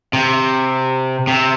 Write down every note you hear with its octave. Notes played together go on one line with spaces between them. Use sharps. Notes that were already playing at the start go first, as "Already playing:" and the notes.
C3
C3